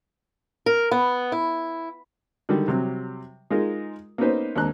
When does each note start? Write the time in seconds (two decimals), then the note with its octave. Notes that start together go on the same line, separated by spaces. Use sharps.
0.66 A#4
0.91 B3
1.32 E4
2.49 D3 D#3 G3
2.68 C3 F#3 G3
3.50 G#3 D#4 F4 G#4 A#4
4.18 A#3 B3 C#4 D#4 B4 C5
4.56 D#2 C4 D4 A#5 F#6